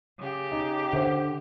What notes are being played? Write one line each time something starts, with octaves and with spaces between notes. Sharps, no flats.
C#3 G4
D#4
D3 C5 E5 F#5